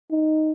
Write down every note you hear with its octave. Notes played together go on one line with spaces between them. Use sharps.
D#4